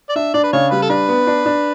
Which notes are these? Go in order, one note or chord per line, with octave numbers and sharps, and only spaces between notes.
D5
D4 E5
D4 D5
B4
C#3 C#5
G3 B4
A4
D4 B4
B3
D4
D4